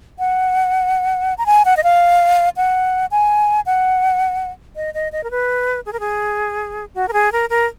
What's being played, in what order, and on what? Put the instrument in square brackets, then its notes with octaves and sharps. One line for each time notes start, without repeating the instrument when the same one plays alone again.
[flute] F#5
A#5
G#5
F#5
D#5
F5
F#5
G#5
F#5
D#5
D#5
D#5
A#4
B4
G#4
A#4
G#4
F#4
A#4
G#4
A#4
A#4